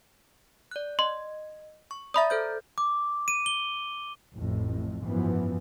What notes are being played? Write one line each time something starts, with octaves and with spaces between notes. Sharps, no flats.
D5 F#6
D#5 C6
C#6
D5 E5 A#5 B5 D#6 A6
A4 C5 G6
D6
D#7
G7
A1 F2 A2
G#1 F#2 E3 F3 B3